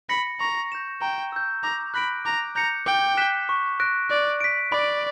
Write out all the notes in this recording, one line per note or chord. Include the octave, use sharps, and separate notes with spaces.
B5 A#6 C#7
A#5 C#6
G6 A#6 E7
G5 A#5
E6 G6
A#5 D6
B5 F#6 A#6 D7
A#5 D6
A#5 G6 C#7
G5 D6
F#6 B6 E7 G7
C#6
F#6 A#6 D7
D5 F#6
B6 D7
D5 B5